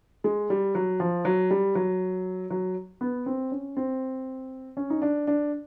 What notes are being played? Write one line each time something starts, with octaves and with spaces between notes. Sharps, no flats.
G#3
G3
F#3
F3
F#3
G3
F#3
F#3
B3
C4
C#4
C4
C#4
D#4
D4
D4